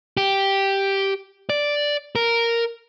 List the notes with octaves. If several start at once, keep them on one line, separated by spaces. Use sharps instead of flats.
G4
D5
A#4